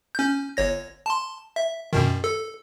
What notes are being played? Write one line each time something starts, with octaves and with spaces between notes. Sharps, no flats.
C#4 G6
G1 C#5 A#6
A5 C6
E5
F#2 B2 D#3
A4